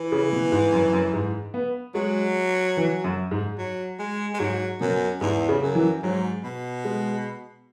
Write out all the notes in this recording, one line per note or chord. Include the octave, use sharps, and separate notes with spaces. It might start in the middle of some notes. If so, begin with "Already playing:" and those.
Already playing: E3
C#3
B2
G#2
F#2
F#2
G#2
B3
F#3 G#3
E3
F#2
G#2
F#3
G#3
G#3
G#2 F#3
F#2 B2
E2 G#2
C#3
F#2
E3
G#2 F#3
B2
G#3